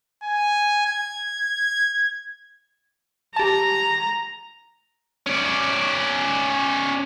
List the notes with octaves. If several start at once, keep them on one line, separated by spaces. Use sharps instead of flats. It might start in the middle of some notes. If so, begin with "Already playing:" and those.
G#5
G#6
G4 A5 A#5
C#4 D5